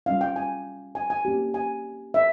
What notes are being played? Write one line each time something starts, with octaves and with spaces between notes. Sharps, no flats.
G3 C#4 F4 F5
G5
G#5
G#5
G#5
A#3 C#4 G4
G#5
E5